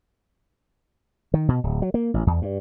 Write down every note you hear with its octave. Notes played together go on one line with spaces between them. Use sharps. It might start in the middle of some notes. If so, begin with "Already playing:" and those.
D#3
B2
D1
F#3
A#3
A1
E2
G2